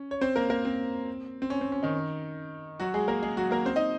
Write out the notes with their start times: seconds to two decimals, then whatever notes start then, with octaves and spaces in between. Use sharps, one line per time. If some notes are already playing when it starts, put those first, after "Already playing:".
Already playing: C#4
0.11 C#5
0.21 C4 C5
0.36 A#3 A#4
0.50 A#3 A#4
0.65 C4
1.42 C4
1.50 C#4
1.61 C4
1.72 C#4
1.83 D#3 D#4
2.80 F#3 F#4
2.94 G#3 G#4
3.08 A#3 A#4
3.22 G#3 G#4
3.37 F#3 F#4
3.51 A#3 A#4
3.65 C4 C5
3.76 D#4 D#5